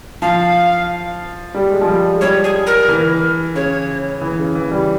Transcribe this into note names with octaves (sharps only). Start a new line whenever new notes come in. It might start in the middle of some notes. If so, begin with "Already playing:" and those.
F3 F5
G3
G#3
F3
G3
G#3
G3 C#5
G#4
A#4
E3
C#3 C#5
E3
C#3
E3
G3